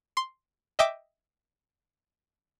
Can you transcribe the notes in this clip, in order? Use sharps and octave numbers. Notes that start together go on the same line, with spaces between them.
C6
D#5 E5 G5 D6